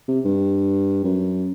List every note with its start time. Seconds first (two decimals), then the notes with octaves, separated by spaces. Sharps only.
0.08 C3
0.25 G2
1.04 F#2